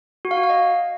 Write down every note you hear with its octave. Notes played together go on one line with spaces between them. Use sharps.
F#4
F5
F#4
F5
D#5